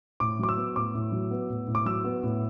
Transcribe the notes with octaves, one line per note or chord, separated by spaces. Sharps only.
A2 D6
F#3 D6
E6
B3
A2 D6
A2
F#3
B3
A2
A2
D6
F#3 E6
B3
A2